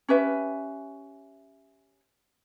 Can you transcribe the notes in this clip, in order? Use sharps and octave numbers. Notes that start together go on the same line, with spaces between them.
C#4 G4 B4 E5